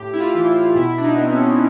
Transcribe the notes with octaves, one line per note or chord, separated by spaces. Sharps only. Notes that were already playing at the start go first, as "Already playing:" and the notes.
Already playing: A2 G4
E4
F4
E3
E4
B2 E4
D4
D#4
B3
C4
C#4